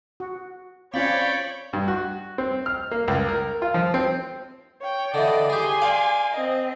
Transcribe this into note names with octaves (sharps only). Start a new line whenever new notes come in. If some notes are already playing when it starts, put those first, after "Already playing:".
F#4
C4 C#4 F4 C#5 D5 F5 G5 B5
G2
F#4
C4
F6
A#3
C#2
A#4
F4
F3
C4
C#5 G5
D3 E3 D5 D#5
G4 G#4 G#5 C6
D5 F5
C4 D#5